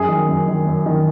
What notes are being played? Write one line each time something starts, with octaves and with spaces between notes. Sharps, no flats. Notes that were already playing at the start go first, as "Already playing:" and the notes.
Already playing: F#2 G#4
D#3
F#2
D#3
F#2
D#3